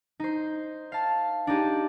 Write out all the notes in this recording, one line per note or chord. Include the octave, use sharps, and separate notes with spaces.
D#4 C5
F5 A5
D4 D#4 G4 G#4